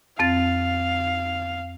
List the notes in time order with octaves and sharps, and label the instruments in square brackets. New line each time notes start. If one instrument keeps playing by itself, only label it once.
[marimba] F2 C4 A6 [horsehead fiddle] F5